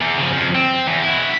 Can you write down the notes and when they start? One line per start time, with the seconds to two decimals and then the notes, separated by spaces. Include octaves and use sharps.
0.01 E2
0.17 C#3 F3
0.33 F2 F3
0.55 C4
0.87 E2
1.04 E4 F#4